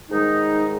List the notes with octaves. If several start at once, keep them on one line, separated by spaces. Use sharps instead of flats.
G#2 D#3 G3 D#4